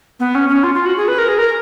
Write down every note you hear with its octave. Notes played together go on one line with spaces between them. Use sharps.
B3
C#4
C#4
F4
F4
F#4
G#4
B4
A#4
G#4
A#4